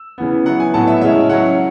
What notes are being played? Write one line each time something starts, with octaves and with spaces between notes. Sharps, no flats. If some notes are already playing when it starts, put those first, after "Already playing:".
Already playing: E6
C#3 E3 B3
F#3 B3 E4 F#5
G#5
A2 F#3 B3 A5
E5
C#3 G#3 C#4 E4 E5
F#3 C#4 E4 F#5